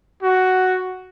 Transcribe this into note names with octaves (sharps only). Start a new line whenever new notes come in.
F#4